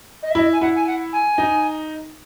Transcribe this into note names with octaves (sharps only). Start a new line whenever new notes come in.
D#5
E5
E4 D#5
G#5
E4 F#5
G#5
F#5
G#5
D#4